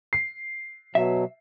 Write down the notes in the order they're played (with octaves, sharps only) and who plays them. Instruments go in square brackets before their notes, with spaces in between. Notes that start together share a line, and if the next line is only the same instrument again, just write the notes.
[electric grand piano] C7
[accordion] B2 F#3 [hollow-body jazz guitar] E5